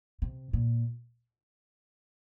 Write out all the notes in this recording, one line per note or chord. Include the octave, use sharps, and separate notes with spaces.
C3
A#2